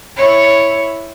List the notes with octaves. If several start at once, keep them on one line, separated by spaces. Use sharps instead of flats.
E4 C#5